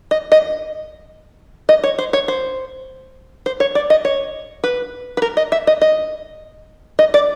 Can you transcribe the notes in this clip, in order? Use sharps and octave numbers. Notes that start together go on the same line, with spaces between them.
D#5
D#5
D#5
C#5
C5
C#5
C5
C5
C#5
D5
D#5
C#5
B4
B4
A#4
D#5
E5
D#5
D#5
D#5
D5